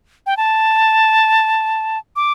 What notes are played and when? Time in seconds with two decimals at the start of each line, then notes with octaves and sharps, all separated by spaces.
0.26 G5
0.37 A5
2.16 D6